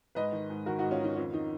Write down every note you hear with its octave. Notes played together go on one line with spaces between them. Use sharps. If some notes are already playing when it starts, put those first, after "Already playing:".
G#2 B4 D#5
D#3
G#2
D#3 F#4 A#4
D#4 F#4
G#2
C#4 F4
D#3 D#4
F2 C#4
D#3 D#4